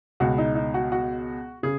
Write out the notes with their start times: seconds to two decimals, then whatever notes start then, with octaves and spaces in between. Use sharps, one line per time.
0.20 C#2 B2 F#4
0.38 D#4
0.55 D#4
0.74 F#4
0.92 F#4
1.63 C#3 G#4